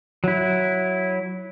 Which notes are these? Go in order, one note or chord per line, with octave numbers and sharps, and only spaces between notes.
F#3 E4